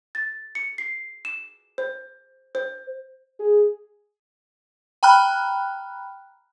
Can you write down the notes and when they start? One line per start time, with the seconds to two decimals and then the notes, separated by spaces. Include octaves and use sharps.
0.15 A6
0.55 C#7
0.78 C7
1.25 E7
1.78 C5
2.55 C5
3.40 G#4
5.03 G5 A#5 B5 F6 F#6